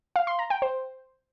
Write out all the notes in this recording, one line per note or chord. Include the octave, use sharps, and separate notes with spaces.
F5
C6
A#5
G5
C5